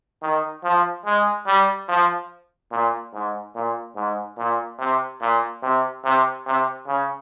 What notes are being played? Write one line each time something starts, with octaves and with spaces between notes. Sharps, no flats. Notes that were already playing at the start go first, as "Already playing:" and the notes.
D#3
F3
G#3
G3
F3
A#2
G#2
A#2
G#2
A#2
C3
A#2
C3
C3
C3
C#3